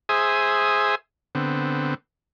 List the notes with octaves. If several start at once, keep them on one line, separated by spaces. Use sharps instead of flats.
G#4 C5 E5 G#5 D#6
D3 B3 C4